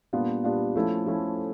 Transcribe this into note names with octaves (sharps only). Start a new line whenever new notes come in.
A#2 G3 B3 D4 F4
A#2 G3 B3 D4 F4
F3 A3 C#4 E4 A4
F3 A3 C#4 E4 A4